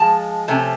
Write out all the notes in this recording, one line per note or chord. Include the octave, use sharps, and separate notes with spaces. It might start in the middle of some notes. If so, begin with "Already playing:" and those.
Already playing: F3 G#3 A5
C3 F3 A3 C#4